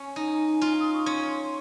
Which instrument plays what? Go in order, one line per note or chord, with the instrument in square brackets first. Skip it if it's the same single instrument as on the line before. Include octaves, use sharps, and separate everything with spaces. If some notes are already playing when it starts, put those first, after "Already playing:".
Already playing: [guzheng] C#4 [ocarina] G#5
[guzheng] D#4
F4
[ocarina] D#6
C#6
[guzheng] C#4 [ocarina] C6